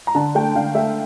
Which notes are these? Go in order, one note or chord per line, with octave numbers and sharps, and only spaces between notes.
A#5
D3 A5
A3 G5
D3 F5
A3 E5